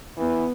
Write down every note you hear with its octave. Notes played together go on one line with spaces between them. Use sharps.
E3 B3